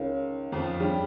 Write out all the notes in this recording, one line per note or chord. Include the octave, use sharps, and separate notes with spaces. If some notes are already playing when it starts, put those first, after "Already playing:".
Already playing: C#2 C#3 D#4 A#4 C#5 F5
F2 F3
G2 G3 G#4 C#5 G5